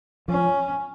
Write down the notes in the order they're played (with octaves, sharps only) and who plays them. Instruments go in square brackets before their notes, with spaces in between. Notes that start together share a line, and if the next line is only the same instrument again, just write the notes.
[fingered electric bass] F3 [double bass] C#4